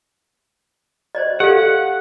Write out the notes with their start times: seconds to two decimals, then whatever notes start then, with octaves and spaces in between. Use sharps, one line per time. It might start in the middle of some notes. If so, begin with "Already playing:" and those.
1.15 C5 D5 D#5
1.40 G4 A4 F5 F#5